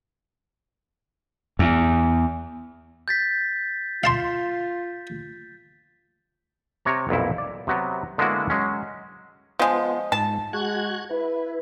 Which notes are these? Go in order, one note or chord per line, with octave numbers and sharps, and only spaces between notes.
E2
G6 A6 B6
F4 F5 A5 C6
C3 C#5 A#5
B1 F2 A#2 E4
D5
C3 F#3 B3
D3 G#3 A#3 B3 E4 F#4
F#3 G#3 C#4
F3 G#3 B3 F4
G#2 A5
G#3 F#4 F#6 G#6
E4 B4